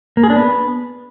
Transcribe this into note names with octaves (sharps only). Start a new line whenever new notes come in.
A#3
G#4
D4
B3